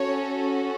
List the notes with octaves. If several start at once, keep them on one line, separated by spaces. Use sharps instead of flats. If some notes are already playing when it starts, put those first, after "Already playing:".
Already playing: C#4 F#4 A4 C#5